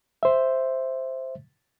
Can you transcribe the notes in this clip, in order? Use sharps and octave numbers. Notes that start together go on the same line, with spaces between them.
C5 E5